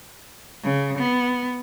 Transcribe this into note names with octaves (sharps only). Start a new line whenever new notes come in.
C#3
B3